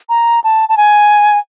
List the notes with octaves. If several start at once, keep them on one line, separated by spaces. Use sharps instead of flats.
A#5
A5
A5
G#5